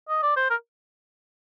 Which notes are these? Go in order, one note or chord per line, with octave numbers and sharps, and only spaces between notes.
D#5
D5
C5
A#4